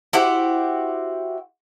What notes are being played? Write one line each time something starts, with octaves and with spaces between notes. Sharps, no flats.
E4 F#4 G4 C5